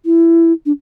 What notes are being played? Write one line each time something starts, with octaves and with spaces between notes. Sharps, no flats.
E4
D4